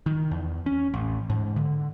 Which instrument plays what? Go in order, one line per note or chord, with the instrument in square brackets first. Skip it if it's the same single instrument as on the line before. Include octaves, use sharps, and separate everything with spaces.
[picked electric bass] D#3
E2
C#4
A1
G#2
D3